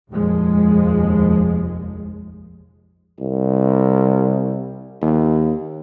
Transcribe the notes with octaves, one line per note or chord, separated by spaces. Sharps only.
F1 A#1 D#2 F3 G#3
C2
D#2